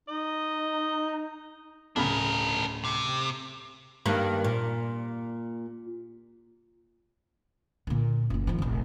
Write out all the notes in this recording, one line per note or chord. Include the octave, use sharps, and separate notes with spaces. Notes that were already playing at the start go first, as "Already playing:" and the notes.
D#4 D#5
D1 C#3 D4 A#4 B5
C3
G2 D#3 A#3
A#2
A#2 D3
F#1 E3
D#3 F3
F1 A#1